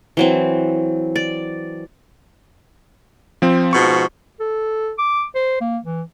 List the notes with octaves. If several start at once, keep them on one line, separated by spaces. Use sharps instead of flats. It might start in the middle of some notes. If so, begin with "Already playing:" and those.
E3 F#3 C4
D5
F3 C4
G#2 B2 F3 C#6
A4
D6
C5
A#3
E3